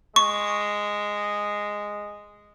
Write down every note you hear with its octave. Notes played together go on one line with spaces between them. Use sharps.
G#3 C#6